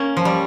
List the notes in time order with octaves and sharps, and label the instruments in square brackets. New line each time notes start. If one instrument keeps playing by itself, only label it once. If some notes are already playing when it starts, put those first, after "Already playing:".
Already playing: [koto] A#3 C#4
F3
G3